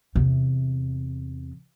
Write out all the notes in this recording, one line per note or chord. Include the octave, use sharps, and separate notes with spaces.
E2 C3